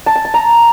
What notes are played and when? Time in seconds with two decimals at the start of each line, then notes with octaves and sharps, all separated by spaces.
0.06 A5
0.16 G#5
0.25 A5
0.34 A#5